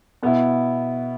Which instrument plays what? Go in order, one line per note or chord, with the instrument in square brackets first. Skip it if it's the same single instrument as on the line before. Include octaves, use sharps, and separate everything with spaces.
[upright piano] B2 B3 E4